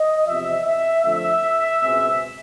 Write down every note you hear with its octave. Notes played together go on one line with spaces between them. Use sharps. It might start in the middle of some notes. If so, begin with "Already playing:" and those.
Already playing: D#5
E2 C3 F3 E5
E5
F2 D3 F3 A3 C4 E5
C#2 B2 G#3 C4